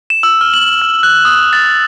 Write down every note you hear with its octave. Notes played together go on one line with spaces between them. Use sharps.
E7
E6
F6
F#7
F6
F#6
D#6
A6